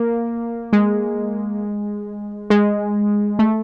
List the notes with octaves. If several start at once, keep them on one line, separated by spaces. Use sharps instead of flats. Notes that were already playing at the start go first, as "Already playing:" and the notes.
Already playing: A#3
G#3
G#3
A3